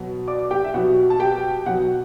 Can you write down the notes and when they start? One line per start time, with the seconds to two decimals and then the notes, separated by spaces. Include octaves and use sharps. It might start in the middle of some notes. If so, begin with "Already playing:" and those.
Already playing: B2 F#3
0.28 D5 D6
0.51 G4 G5
0.64 E5
0.74 B2 F#3 F#5
1.10 A5
1.20 G4 G5
1.66 B2 F#3 F#5